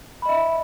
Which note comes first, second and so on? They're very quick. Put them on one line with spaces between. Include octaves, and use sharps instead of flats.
B5 D#5 E5